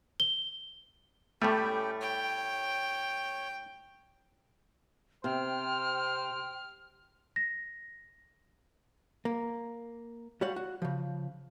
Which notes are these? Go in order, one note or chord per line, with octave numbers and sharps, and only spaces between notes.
G7
A2 G3 A3 C#4 G4 G5
C#5 G5
C3 C5 G5 F6
A#6
A#3
G3 G#3 F#4 C#5 F5 F#5
F#4
C#3 F3